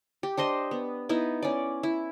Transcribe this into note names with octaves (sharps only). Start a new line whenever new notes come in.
G4
D4 C5 D#5 C6
B3
B3 D#4 E4
C#4 D5
E4